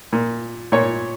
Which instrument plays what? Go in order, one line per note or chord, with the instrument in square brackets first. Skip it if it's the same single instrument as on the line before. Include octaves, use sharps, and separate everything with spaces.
[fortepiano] A#2
A#2 C#5